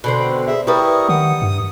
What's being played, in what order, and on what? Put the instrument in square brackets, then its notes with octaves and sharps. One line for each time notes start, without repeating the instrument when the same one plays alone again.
[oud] B2 D3 C4 [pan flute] B5
[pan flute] G#4 [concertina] E5
[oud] G3 B4 [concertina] E4 A#4 C#6 [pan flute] D#6
[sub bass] D#3 [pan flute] F#5 [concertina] D#6
[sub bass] G2